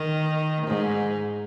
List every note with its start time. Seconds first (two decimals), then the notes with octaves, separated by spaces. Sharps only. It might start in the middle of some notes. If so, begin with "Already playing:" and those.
Already playing: D#3
0.67 G#2